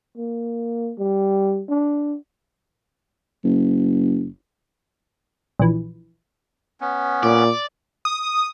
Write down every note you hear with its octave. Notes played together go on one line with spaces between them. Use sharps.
A#3
G3
D4
F#1
A#1 E3
B3 C#4
A#2 D5
D#6